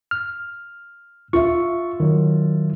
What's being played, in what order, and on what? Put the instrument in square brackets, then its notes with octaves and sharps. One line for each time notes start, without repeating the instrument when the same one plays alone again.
[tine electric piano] F6
[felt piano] F4 E5 [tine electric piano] C#6
[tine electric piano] D#3 F#3